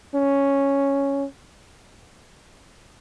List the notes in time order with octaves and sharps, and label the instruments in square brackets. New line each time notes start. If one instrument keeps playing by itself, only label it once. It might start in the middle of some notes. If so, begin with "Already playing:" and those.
[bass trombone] C#4